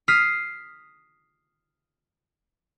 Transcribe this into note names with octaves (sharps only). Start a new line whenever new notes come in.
D#6 F6 B6 C7 D#7